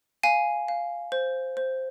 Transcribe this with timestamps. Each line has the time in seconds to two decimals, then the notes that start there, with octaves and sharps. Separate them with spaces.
0.23 F5 G#5
0.68 F5
1.12 C5
1.57 C5